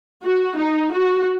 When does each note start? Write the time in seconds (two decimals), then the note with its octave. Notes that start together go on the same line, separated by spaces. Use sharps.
0.24 F#4
0.58 D#4
0.93 F#4